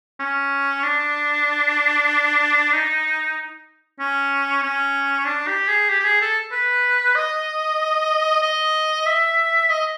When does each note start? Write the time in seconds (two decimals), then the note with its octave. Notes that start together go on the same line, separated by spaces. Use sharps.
0.19 C#4
0.83 D4
2.73 D#4
4.00 C#4
4.63 C#4
5.26 D4
5.47 G4
5.68 G#4
5.89 G4
5.99 G4
6.04 G#4
6.22 A4
6.52 B4
7.15 D#5
8.42 D#5
9.06 E5
9.70 D#5